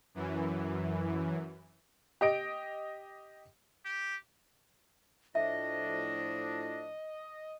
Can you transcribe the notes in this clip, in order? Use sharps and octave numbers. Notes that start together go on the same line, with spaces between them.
F#2 E3
G4 D#5 D7
G4
A2 F3 D4 D#5 E5 A#6